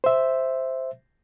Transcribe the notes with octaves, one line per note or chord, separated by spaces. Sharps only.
C5 E5